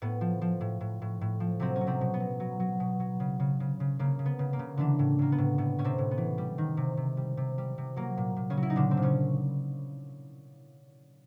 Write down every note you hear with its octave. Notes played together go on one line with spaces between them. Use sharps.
A2 B3
F3
F3
A2
A2
A2
A2
F3
C3 F#3 C4
C#4
F#3
C3 C4
B2
B3
F#3
F#3
F#3
B2
F#3
C#3
C#3
C#3
C#3
C#3 A#3
C#3
B3
C#3
A#3
C#3
D3 E3 D4
A2
A2 A#3
B3
A2
A2 B3
A2 C#4
C3 C4
A2
B3
E3
G3
D#3
C3
C3
G3
C3
G3
C3
F#3 A#3
A#2
A#2
C#3 C#4
F#3
E4
D#4
A#2 D3 D4
C4
A#2
C#3 C#4